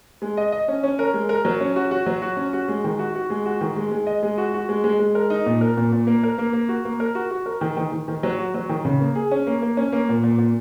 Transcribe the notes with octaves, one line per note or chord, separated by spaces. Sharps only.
G#3
D#5
D#5
C#4
C#4
A#4
G#3
A#4
F#3
C#4
F#4
F#4
F#3
F#4
C#4
F#4
G#3
D#3
F#4
F#4
G#3
F#4
D#3
G#3
G#3
D#5
G#3
F#4
F#4
G#3
G#3
G#3
A#4
D#4
A#2
A#4
A#2
A#2
A#3
A#4
A#3
A#3
F#4
A#3
A#4
F#4
F#4
A#4
D#3
D#3
D#3
D#3
F#3
F#4
F#3
D#3
C#3
A#3
G#4
C#4
A#3
A#3
C#4
A#3
A#2
A#2
A#2